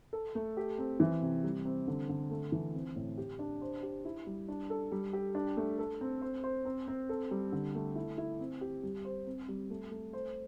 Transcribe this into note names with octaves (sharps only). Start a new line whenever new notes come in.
A4
A3
G4
C4
E3
C3
G3
C4
D3
D3
A3
E3
C4
A2
G4
D4
C5
G4
E4
G3
D4
A4
G3
G4
D4
A3
A4
C4
C5
C5
C4
C4
A4
G3
D3
A3
E4
E4
C4
G4
G3
C5
C4
G3
A3
A3
C5